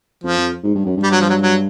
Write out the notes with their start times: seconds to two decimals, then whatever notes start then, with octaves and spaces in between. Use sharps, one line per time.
0.23 F2 F3
0.37 F2
0.63 G#2
0.75 G2
0.86 F#2
0.97 G2
1.03 G3
1.11 F#3
1.21 F3
1.29 F#3
1.42 F#3